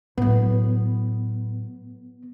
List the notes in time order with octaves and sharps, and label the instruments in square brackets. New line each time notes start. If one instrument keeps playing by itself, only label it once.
[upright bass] A2 F#3 [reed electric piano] B3